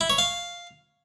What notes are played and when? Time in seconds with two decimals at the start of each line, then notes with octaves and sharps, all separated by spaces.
0.01 E4
0.10 C#5
0.18 F5